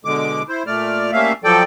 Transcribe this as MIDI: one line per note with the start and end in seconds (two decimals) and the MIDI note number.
0.05 0.42 47
0.05 0.42 50
0.05 0.42 56
0.05 0.42 86
0.49 0.63 64
0.49 0.63 72
0.67 1.11 46
0.67 1.11 57
0.67 1.11 74
0.67 1.11 89
1.13 1.33 55
1.13 1.33 57
1.13 1.33 58
1.13 1.33 61
1.13 1.33 76
1.13 1.33 77
1.44 1.63 53
1.44 1.63 54
1.44 1.63 69
1.44 1.63 74
1.44 1.63 79